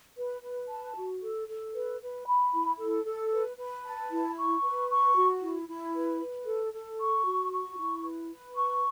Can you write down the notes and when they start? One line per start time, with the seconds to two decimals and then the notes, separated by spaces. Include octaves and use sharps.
0.17 B4
0.42 B4
0.69 A5
0.96 F#4
1.22 A4
1.47 A4
1.74 B4
2.00 B4
2.26 B5
2.53 E4
2.78 A4
3.05 A4
3.31 B4
3.57 B4
3.84 A5
4.10 E4
4.36 C#6
4.63 B4
4.89 C#6
5.15 F#4
5.41 E4
5.68 E4
5.94 B4
6.20 B4
6.46 A4
6.73 A4
6.99 C#6
7.25 F#4
7.52 C#6
7.77 E4
8.03 B4
8.30 B4
8.56 C#6